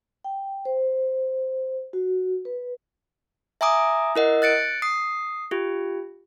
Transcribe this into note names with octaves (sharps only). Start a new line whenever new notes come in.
G5
C5
F#4
B4
E5 G#5 A#5 D6 D#6
E4 A#4 D#5 F#5
F#6 A6 C#7 D7
D#6 C7
F4 G4